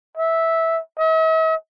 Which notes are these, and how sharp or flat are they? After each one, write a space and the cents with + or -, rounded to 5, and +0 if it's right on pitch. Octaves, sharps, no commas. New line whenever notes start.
E5 -10
E5 -45